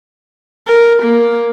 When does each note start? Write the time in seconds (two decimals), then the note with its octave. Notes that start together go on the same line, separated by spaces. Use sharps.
0.67 A#4
1.03 A#3